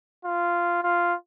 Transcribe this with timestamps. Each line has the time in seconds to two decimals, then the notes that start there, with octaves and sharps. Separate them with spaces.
0.25 F4
0.83 F4